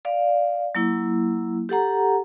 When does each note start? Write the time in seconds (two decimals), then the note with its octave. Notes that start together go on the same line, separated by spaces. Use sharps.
0.05 D5 F5
0.75 F#3 A#3 E4
1.69 G4 A4 F#5 A#5